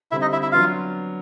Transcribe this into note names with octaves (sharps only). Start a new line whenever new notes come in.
D3 G3 C4 E4 E5
D#4 D#5
E4 E5
E4 E5
F#3 B3 D4 F4 F5